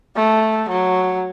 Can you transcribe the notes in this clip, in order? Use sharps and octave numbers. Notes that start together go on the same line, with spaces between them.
A3
F#3